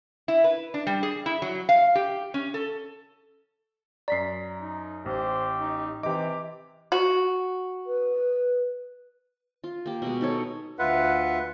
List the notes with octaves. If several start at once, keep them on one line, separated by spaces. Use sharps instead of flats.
E4
B4
D4
G3
G#4
E4
F#3
F5
G4
C#4
A4
F#2 D5 A#5 B6 C7
D#4
A1 G4 C5
D#4
C3 E3 G4 D#5 D6
F#4
B4
F4
A#3 G4
B2 G#3
D#4 A4 C#5
D2 F4 B4 E5 F#5